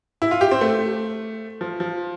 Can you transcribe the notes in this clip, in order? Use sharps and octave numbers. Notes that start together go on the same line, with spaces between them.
E4
F4
G4
C4
A3
F3
F3